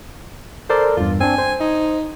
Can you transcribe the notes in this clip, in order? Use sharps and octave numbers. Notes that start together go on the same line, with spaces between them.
A4 A#4 C5 D5
E2 G2 F4
C4 D4 G#5
C5
D#4